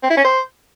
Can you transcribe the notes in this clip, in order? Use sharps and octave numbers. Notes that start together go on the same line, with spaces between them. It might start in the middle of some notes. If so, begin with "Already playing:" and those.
C4
E4
C#4
C5